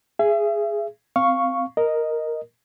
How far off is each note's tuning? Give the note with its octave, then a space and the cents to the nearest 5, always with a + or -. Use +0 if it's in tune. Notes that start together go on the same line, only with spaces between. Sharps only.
G#4 +0 E5 +35
C4 -15 F5 +0 C#6 +0
A#4 +0 D#5 +0